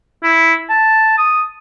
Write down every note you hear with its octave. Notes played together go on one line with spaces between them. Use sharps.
E4
A5
D#6